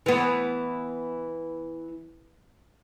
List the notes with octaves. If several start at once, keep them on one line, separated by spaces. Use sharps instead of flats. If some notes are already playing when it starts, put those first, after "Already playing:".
E3 B3